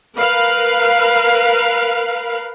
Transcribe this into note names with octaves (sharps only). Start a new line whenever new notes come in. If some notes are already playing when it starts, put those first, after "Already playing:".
A#4 B4 F5